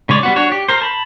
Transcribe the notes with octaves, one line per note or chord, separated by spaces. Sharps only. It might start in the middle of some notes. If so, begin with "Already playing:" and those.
C#3 G#3 C#5 D5
G3 B3 F#4
D4 F#4 C#5
G4
A#4 C5
A5 B5